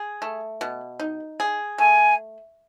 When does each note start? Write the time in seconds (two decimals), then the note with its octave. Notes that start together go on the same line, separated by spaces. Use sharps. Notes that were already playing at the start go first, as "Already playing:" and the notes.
Already playing: G#4
0.22 A3
0.61 B2
1.00 D#4
1.40 G#4
1.78 A3 G#5